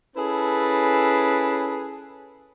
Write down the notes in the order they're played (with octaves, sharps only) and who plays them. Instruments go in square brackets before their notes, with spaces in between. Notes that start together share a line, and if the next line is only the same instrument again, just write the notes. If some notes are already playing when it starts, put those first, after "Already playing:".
[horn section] C#4 E4 G#4 A4 B4